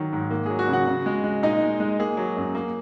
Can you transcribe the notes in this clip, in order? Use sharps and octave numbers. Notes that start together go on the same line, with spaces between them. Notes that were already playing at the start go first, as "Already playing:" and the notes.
Already playing: D#3 F#3
G#2
A#3
F#3 G#4
F#4
C#3
F#4 F#5
C#3
G#3
G#3
A#2 D#4 D#5
G#3
G#3
A#3 G#4
F#3
F#2
A#3